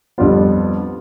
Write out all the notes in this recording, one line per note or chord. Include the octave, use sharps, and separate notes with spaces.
F2 D3 G3 B3 F4